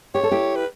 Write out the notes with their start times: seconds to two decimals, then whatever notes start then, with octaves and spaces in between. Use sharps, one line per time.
0.14 G4 C#5
0.23 A4
0.31 E4 G4
0.56 B4